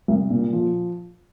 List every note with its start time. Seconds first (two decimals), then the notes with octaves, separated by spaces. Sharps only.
0.08 C2
0.30 A#2
0.53 F3